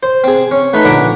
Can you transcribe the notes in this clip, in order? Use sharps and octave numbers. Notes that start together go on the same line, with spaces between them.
C5
C4 G#4
C#4
A3 D#4 B4
A#1 D3 A#5 B5 D6